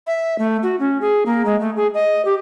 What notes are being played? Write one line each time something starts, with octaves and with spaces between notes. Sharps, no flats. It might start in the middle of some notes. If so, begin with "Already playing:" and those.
E5
A3
F#4
C#4
G#4
A#3
G#3
A3
G#4
D#5
G4